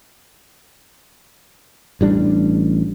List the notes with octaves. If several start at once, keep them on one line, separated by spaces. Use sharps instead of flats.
A1 G3 D4